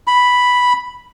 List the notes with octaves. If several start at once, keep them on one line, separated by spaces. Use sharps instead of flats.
B5